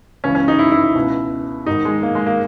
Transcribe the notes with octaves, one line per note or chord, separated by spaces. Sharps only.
C#2 C#3 E3 C#4
C#4
D#4
E4
E4
E4
C#2 B2
G#2 D#3 D#4
G#3
A#3
G#3
A#3